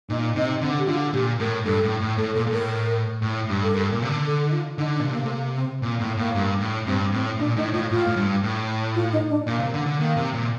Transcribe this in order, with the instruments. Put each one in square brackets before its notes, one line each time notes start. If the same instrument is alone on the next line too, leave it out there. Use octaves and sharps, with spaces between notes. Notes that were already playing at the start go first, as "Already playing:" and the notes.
[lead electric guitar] A#2 [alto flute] D#4
[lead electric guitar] C3 [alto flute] D#4
[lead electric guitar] D3 [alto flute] C4
[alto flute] G4
[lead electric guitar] D3 [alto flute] F4
[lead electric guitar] A#2 [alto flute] G4
[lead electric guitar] A2 [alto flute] A#4
[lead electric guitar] G2 [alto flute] A4
[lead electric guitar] A2
A2
[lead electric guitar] A2 [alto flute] A4
[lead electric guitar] A#2 [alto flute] A4
[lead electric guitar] A#2
[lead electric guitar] A2 [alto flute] A#4
[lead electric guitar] A2
G2
[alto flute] A4
[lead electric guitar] G2 [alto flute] A#4
[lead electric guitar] A#2
C3
D3
[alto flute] A4
D#4
F4
[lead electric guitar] D3 [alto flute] D#4
[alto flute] D4
[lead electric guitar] A#2
C3
[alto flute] A#3
A3
A#3
C4
[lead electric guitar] A#2 [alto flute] C4
[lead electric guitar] A2 [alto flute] A#3
[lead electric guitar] A2 [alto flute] A#3
[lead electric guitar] G2
A2
[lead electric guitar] G2 [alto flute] C4
[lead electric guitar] A2 [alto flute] C4
[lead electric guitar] A#2 [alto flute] D4
[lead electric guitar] A2 [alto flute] D#4
[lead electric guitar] A2 [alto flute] F4
[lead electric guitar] A2 [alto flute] F4
[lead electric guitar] A2
G2
A2
[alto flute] F4
D#4
D4
[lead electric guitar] A#2 [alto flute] A#3
[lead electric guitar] C3
D3
D3
[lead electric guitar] D#3 [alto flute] A#3
[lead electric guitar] C3
A#2